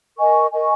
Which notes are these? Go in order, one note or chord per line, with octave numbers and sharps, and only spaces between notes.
A#4 D#5 G#5 C#6
A#4 D#5 G#5 C#6